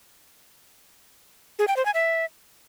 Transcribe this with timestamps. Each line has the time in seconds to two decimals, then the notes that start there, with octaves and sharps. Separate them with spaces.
1.59 G#4
1.68 G5
1.77 C5
1.85 G#5
1.94 E5